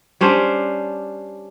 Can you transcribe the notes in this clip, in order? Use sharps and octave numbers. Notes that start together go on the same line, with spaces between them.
G3 C#4 D4 C5